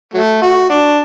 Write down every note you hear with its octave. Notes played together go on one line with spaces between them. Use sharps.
F#3 A3
F#4
D4